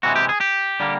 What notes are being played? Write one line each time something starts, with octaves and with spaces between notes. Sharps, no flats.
C3 E3 G#3 F#4
G4
G#4
G4
D3 G3 A#3